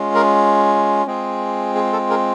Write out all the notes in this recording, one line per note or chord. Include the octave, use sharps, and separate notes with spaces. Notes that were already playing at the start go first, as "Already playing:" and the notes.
Already playing: G#3 C#4 F4
G#4 A#4
G#3 C4 F4 G#4
G#4
A4
G#4 A#4